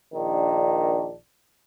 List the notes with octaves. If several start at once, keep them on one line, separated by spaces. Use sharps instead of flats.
A#1 D#3 D4